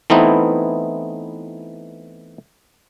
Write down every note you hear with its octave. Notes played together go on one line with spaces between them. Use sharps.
E3 A3 B3 C4 D#4 E4